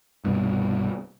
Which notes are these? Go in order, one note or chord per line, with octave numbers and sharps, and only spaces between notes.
C2 G2 B2